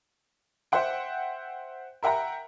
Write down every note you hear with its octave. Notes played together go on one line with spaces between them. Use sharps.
C5 E5 F#5 G5
A#4 E5 F#5 G5 A#5